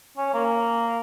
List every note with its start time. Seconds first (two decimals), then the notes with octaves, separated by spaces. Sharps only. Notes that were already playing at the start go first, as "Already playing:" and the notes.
0.17 C#4
0.34 A#3